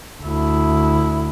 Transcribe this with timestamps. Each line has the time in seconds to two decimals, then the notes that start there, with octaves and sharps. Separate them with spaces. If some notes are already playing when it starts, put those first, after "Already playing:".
0.22 D2 E4